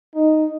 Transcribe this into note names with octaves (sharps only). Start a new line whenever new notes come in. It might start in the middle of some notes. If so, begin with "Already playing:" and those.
D#4